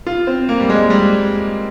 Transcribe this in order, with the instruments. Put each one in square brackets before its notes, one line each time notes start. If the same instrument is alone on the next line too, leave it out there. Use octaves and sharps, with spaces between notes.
[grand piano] F4
C4
A#3
G3
G#3
G3